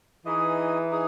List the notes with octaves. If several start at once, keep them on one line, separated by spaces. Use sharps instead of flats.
E3 D#4 G#4 D#5
D#4 G#4